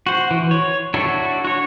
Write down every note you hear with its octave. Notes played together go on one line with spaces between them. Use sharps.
F#4 C5
E3
C#5
D4 E4 F#4 A4 C#5
F#4 C#5